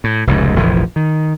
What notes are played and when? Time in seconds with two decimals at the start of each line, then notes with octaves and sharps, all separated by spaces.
0.04 A2
0.27 F1 C#2 G#2
0.56 F1 A#1 E3 F3
0.96 D#3